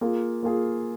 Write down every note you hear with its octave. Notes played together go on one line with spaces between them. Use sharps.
A#3 F4 G#4
A#3 F4 G#4